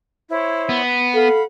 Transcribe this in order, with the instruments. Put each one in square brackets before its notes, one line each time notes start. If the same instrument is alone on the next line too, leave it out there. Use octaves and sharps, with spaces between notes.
[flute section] E4 C5 C#5
[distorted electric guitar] B3
[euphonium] A4 [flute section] F5 F#5 B5